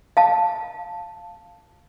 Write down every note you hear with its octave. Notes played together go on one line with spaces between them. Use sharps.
F5 A5